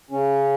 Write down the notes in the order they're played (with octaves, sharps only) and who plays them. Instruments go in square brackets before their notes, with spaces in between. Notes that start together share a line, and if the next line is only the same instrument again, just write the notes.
[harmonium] C#3 C#4